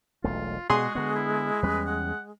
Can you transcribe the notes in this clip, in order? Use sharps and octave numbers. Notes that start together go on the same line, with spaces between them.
E1 B1 A3 F4
B2 G#3 F#4 G#4 C6 D#6
D3 B3 F#4
E4
E2 G3 C#4 B4
F#5